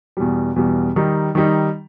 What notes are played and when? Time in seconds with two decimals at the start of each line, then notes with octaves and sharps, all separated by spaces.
0.17 E2 B2 G3
0.56 E2 B2 G3
0.96 D#3 G3 D#4
1.35 D#3 G3 D#4